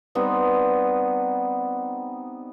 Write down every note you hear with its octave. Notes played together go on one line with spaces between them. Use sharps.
G3 B3 C4 D#4